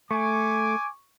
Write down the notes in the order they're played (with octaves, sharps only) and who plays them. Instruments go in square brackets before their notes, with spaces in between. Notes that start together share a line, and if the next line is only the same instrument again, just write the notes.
[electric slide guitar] A3 [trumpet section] G#5 D6 [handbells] C#6